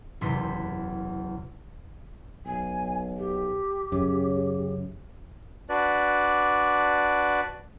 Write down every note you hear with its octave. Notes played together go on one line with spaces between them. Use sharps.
F#1 E2 C3 C6 B6
B1 G#5
G4
F#2 C#3
D4 F#4 B4 D5